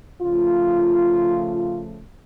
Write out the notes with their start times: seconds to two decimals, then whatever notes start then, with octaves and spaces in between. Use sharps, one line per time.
0.22 C#3 F3 A3 F4